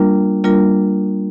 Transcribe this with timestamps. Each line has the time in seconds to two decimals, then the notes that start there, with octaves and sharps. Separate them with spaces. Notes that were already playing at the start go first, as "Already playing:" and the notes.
Already playing: G3 A#3 D4 F4 A#4
0.44 G3 A#3 D4 F4 A#4